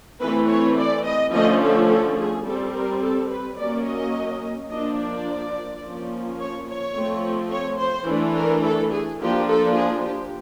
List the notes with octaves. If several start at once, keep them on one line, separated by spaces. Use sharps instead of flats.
E3 A3 C4 B4
C#5
D5
D#5
D3 F3 A3 C#4 D#5
A4
A4
G#4
G3 C4 A4
A#4
A4
B4
F#3 A#3 C#4 D5
D#5
F3 A#3 D4 D#5
D5
F3 A#3 C#4
C#5
C#5
F3 A3 C4
C#5
C5
E3 A3 D4
A#4
A4
G#4
F3 A#3 D4 G4
A4
G#4
G4